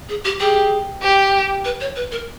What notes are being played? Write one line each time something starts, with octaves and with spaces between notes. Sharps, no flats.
G#4
G4
G4 G#4
G4
B4
C#5
B4
A#4